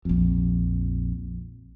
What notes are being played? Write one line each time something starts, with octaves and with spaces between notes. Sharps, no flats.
A#1 F2